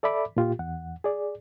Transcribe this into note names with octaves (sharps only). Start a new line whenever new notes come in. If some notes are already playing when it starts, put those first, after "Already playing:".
A4 D5 E5 B5 D6
A#2 F4 G4
E2 F#5
G#4 D5